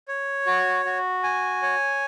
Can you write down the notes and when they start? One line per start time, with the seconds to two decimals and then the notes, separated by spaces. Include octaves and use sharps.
0.08 C#5
0.46 F#4
0.85 F#4
1.23 G#5
1.63 C#5